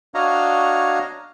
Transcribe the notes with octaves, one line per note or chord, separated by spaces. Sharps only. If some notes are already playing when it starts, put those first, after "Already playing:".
D4 F#4 C#5 D#5 F5 A#5